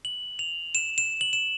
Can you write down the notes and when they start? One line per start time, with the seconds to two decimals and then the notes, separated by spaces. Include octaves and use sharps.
0.05 F#7
0.39 F7
0.75 E7
0.98 E7
1.21 F#7
1.33 E7